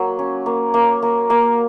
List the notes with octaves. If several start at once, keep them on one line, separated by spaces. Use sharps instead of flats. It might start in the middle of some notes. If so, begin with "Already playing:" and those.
Already playing: F#3 A#3
C#4
A#3
A#3
A#3
A#3